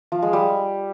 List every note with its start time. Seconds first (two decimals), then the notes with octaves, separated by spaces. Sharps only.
0.12 F3
0.22 G#3
0.33 G3